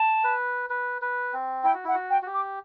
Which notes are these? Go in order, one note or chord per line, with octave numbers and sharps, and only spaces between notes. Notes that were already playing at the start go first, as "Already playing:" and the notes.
Already playing: A5
B4
B4
B4
C4
E4 G5
F#4
E4 F#5
F#4
G5
F#4
G4
D6